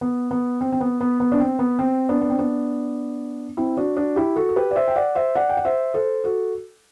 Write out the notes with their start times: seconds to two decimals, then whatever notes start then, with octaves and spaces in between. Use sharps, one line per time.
0.01 B3
0.31 B3
0.61 C4
0.72 C4
0.81 B3
1.01 B3
1.20 B3
1.32 D4
1.40 C4
1.59 B3
1.79 C4
2.09 B3 D4
2.21 B3
2.30 C4
2.39 B3 D4
3.57 C4 E4
3.77 D4 F#4
3.97 D4 F#4
4.16 E4 G4
4.36 F#4 A4
4.49 A4
4.56 G4 B4
4.71 D5
4.76 C5 E5
4.88 G5
4.96 D5 F#5
5.15 C5 E5
5.35 D5 F#5
5.49 G5
5.57 F#5
5.65 C5 E5
5.94 A4 C5
6.24 F#4 A4